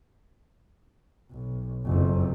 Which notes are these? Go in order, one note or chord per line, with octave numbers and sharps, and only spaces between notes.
B1
F#1 F2